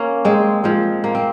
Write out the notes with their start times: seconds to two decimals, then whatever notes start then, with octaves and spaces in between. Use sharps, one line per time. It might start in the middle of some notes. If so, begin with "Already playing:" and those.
Already playing: A#3 C#4
0.25 G#3 C4
0.64 F3 G#3
1.04 A#3
1.15 C4